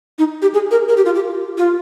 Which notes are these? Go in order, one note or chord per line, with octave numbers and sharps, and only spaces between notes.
D#4
G4
G#4
A#4
A#4
G4
F4
G4
F4